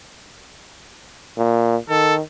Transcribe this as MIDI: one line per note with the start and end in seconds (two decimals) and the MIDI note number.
1.38 1.76 46
1.89 2.21 51
1.89 2.15 69